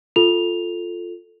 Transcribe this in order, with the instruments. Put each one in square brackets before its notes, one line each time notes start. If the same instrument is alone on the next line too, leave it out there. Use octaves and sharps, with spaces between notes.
[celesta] F4 A4 F7